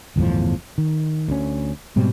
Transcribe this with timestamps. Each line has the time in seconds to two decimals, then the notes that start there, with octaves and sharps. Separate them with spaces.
0.16 G1 E2 A2 F3
0.78 D#3
1.28 D2 C#4
1.96 G#2 B2 G3 C4